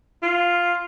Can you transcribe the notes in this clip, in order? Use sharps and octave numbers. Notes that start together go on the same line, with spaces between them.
F4